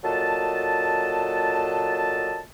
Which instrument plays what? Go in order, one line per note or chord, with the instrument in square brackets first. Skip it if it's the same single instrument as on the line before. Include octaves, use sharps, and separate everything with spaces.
[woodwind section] A#2 F#3 A4 D#5 A5